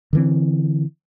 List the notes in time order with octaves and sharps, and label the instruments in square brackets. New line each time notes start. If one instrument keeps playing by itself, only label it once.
[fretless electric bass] D3 E3 C4